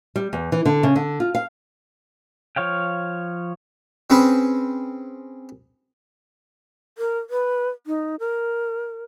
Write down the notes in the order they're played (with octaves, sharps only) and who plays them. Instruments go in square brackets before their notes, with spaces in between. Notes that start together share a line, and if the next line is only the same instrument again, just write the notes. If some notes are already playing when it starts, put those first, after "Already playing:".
[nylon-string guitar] G3
E2
E3
D3
C#3
D3
F4
F5
[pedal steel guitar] F3 C#5 F5 G5
[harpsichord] C4 C#4 G#4 B4
[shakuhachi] A#4
B4
D#4
A#4